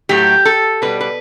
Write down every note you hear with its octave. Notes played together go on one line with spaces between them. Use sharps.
A2 F#3 A3 G4
A4
B2 G3 B4
B4